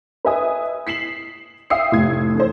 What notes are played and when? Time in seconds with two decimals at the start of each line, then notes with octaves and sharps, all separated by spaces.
0.25 B4 D#5 E5 G#5 D#6
0.87 B6 C7 E7 F#7
1.70 E5 F5 G5 D#6 E6 C7
1.92 F1 A2 G#6
2.35 E3 A3 C5